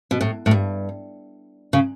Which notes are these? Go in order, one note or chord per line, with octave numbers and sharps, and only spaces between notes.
B2
A2
A2
G2
C#3